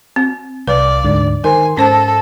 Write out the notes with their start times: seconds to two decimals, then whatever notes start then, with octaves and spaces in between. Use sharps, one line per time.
0.16 C4
0.68 C2 B4 D5 F5
1.05 D2 G#2 D3
1.44 D#3 A#4 C5 G#5 C6
1.77 G#2 C#4 A4 C5 A5 A#6